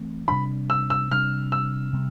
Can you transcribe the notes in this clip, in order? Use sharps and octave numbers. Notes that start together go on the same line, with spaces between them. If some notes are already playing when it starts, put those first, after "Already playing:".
Already playing: E3 A3 C4
C3 G3 D4 B5
E6
E6
C3 G3 D4 F6
E6
C3 G3 B3